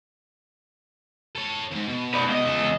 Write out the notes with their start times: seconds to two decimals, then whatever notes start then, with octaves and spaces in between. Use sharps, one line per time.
1.36 A4 C#5
1.71 D#2 G#2
1.88 B2
2.14 B4 D5
2.28 C#2 D#5
2.45 E2 A4